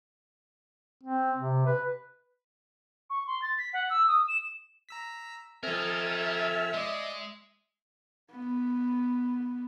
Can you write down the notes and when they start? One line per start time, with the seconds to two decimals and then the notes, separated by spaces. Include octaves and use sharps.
1.03 C4
1.37 C3
1.66 B4
3.10 C#6
3.27 C6
3.42 A6
3.58 B6
3.73 F#5
3.90 E6
4.08 D#6
4.28 E7
4.89 A#5 E6 B6
5.63 F3 C4 A4 A#4 D#5 E5 G#5 F6
6.73 G#3 D5 D#5
8.31 B3